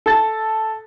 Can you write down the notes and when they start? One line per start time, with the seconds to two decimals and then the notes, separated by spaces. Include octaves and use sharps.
0.06 A4 A6